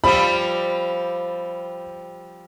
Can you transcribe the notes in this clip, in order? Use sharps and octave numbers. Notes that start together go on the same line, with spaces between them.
F3 G3 C4 B5